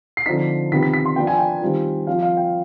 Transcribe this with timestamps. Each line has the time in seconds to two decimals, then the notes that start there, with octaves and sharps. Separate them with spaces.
0.17 C7
0.26 D3 F3 C4 D#4 B6
0.72 C3 D#3 B3 F4 B6
0.83 B6
0.94 B6
1.06 C6
1.16 F3 B3 D4 F4 G5
1.27 G#5
1.38 G5
1.62 D#3 G3 C4 F4
2.07 F3 C4 F4 F5
2.22 F5
2.37 G5